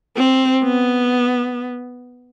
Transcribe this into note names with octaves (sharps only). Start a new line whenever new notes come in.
C4
B3